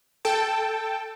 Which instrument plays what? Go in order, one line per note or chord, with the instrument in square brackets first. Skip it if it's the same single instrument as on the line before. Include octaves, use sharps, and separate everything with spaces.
[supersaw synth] A4 G5 A5